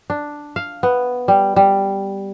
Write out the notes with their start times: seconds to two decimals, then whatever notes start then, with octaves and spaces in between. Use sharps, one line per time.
0.10 D4
0.56 F5
0.83 B3
1.28 G3
1.56 G3